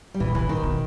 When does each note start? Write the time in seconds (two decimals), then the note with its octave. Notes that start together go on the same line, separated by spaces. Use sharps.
0.14 G3
0.20 A#2 E3
0.35 C#3 E3
0.49 D#3
0.63 B2